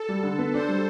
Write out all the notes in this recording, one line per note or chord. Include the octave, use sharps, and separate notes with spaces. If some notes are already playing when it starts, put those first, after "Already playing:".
Already playing: A4
G3
D3
B3
D4 C5
G3